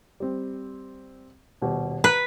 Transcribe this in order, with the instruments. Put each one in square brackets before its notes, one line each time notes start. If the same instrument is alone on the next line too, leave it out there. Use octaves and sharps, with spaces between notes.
[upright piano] G3 C4
D#1 B2 G4
[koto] B4 [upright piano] A#5 F#6